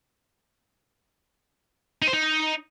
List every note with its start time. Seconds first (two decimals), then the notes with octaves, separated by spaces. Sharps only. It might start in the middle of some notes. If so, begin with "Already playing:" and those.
2.02 D#4
2.08 C5
2.13 D#4